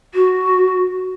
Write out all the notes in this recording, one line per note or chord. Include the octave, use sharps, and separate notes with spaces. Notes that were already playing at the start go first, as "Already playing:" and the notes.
F#4